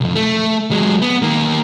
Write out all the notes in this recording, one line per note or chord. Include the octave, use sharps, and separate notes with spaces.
C2 F2
A3
F#3 G#3
B3
D#3 A#3